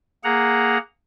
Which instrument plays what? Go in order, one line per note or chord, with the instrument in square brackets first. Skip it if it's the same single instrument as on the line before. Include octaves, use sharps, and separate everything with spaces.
[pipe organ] A#3 G#4 F#5 A#5